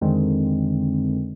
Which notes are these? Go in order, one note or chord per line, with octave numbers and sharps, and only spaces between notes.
F2 D3 D#3 G#3 C4